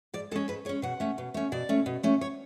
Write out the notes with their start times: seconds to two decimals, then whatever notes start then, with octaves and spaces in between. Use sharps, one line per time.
0.14 G#2 D5
0.31 G#3 A4
0.35 C#4
0.48 G#2 B4
0.65 G#3 C#5
0.69 C#4
0.82 B2 F#5
1.00 A3 C#4
1.18 B2
1.34 A3 C#4
1.52 B2 D5
1.69 A3 C#4
1.86 B2
2.03 A3 C#4
2.21 C#5